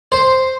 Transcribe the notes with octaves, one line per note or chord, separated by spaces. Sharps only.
C5